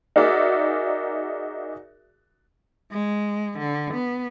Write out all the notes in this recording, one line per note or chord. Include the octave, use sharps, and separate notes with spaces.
D#4 F#4 G#4 A#4 D5 E5
G#3
D3
B3